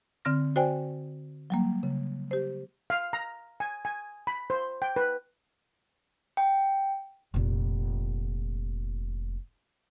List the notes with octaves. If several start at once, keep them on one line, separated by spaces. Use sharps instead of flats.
D3 C4 F6 A#6
F#4 C5 D5 G5 G#5
F#3 G3 A#3
C#3
G4 C5
F5
A#5
G#5
G#5
B5
C5
G5
B4
G5
F1 A#2